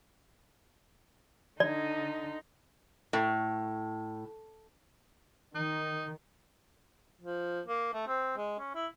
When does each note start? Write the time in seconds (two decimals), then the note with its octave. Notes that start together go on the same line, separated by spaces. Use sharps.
1.60 D3 D#4 D5
3.13 A2
5.55 D#3 D#4
7.21 F3
7.67 A#3
7.94 A3
8.07 C4
8.37 G#3
8.59 C#4
8.75 E4